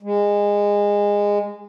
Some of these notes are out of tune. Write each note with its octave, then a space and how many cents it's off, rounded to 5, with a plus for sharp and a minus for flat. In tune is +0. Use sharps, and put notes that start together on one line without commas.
G#3 -20